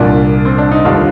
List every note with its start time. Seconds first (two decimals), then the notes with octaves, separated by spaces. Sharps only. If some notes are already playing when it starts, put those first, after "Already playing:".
Already playing: C2 A#2 F3 D4
0.45 C4
0.58 D4
0.71 D#4
0.85 D#2 D3 G3 D4 F4